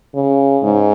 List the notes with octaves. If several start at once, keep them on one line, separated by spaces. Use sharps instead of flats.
C#3
G#2